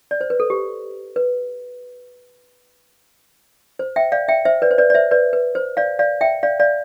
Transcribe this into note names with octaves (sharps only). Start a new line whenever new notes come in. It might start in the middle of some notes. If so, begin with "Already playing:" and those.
D5
C5
B4
A4
G4
B4
C5
E5 G5
D5 F5
E5 G5
C5 E5
B4 D5
C5
B4 D5
D5
C5 E5
B4 D5
B4
C5
D5 F5
D5 F5
E5 G5
D5 F5
D5 F5